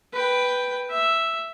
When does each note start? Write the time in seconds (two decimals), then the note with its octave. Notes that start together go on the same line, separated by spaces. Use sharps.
0.13 B4 G5
0.90 E5